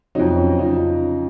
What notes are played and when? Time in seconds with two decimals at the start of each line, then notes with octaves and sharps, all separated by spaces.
0.15 F2 C3 F#3 D#4
0.37 C#4
0.58 F2 C#3 F3 D#4